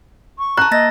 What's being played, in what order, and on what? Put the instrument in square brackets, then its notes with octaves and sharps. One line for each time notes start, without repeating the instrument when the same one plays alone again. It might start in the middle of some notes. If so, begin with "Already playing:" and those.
[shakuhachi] C#6
[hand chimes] A5 A#5 [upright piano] F#6
[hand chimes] A#3 A6 A#6 [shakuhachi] D#5